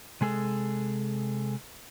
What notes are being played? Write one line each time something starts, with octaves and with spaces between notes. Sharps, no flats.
C3 G#3 G#4 A4